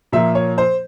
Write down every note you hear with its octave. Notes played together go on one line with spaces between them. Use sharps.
A#2 F3 A#3 E5
C#5
C5